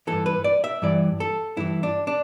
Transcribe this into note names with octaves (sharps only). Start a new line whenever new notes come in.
G2 E3 A4
B4
D5
E5
G2 E3 D5
A4
G2 E3 E4
D4
D4